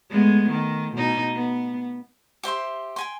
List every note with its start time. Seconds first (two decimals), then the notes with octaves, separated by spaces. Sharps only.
0.10 G#3 A3 B3
0.50 D#3
0.94 B2 D#4
1.35 B3
2.43 G4 C5 E5 C6
2.96 G5 G#5 C6